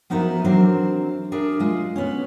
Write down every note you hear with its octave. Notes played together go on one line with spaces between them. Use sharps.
F3 B3 D#4 E4 F#4 A#4
E3 F#3 C4 D4 A#4 C5
D4 G#4 A#4 E5
G#3 F4
B3 C#4